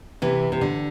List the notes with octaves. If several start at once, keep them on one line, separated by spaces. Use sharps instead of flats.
C3 E3
C3
D3